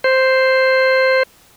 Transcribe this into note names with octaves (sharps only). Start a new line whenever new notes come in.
C5